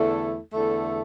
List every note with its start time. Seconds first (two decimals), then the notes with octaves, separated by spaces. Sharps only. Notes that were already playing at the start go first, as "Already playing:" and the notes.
Already playing: E2 D3 A3 E4 A4
0.53 E2 D3 A3 E4 A4